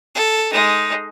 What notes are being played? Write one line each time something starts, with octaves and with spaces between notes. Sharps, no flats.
A4
G#3 D#4